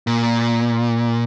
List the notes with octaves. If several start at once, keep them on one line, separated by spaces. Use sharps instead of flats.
A#2